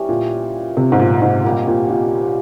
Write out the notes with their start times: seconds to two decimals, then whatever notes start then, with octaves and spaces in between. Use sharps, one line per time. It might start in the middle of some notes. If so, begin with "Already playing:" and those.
Already playing: E3 G3 C#4
0.09 A#2
0.77 C3
0.92 G#2
0.99 A#2
1.22 G#2
1.44 A#2 G3 A#3 C#4 G4
1.67 A#2
1.90 A#2